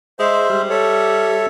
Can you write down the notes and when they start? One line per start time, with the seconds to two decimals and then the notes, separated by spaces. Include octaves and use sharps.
0.19 G#3 C5 E5
0.50 G3
0.70 A4 C#5 E5